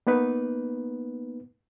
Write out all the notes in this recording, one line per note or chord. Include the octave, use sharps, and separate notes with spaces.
A#3 B3 D#4 B4